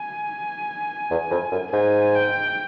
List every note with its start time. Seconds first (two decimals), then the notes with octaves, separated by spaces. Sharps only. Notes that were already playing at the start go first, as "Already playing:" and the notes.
Already playing: G#5
1.11 E2
1.31 F2
1.52 F#2
1.73 G#2 G#5
2.15 G5